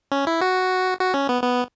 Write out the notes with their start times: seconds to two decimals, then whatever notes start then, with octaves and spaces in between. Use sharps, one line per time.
0.12 C#4
0.27 E4
0.41 F#4
1.00 F#4
1.14 C#4
1.29 B3
1.43 B3